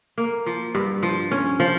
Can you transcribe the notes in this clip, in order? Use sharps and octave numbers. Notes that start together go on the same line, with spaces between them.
A#3
F3
G2
F3
C#4
F3